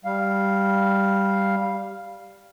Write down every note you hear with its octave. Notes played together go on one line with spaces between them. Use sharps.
G3 F5